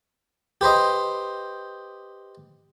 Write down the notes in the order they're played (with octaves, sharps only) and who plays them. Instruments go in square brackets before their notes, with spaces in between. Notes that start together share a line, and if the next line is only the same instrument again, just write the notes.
[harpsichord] G4 B4 C5 D#5